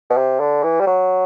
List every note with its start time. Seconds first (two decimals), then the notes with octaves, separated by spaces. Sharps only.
0.10 B2
0.17 C3
0.40 D3
0.63 E3
0.80 G3
0.87 F#3